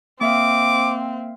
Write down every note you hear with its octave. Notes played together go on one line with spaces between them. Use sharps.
A#3 C4 E5 F5 D6